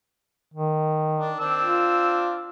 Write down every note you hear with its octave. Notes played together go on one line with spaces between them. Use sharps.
D#3
D4
C4 D4 E6
F4